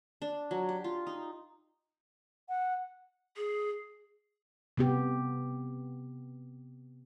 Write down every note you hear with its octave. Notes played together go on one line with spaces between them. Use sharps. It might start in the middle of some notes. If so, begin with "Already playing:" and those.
D4
F#3
G4
F4
D#4
F#5
G#4
C3 B3 G4